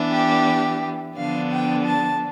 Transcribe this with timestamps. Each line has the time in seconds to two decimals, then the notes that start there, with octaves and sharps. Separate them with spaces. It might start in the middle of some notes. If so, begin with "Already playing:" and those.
Already playing: E3 B3 D4
0.11 G4
1.16 D3 F3 B3 D4 F5
1.51 G5
1.85 A5